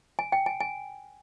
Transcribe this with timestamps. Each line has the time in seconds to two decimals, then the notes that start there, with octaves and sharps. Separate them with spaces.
0.19 G#5
0.32 G5
0.46 G#5
0.60 G#5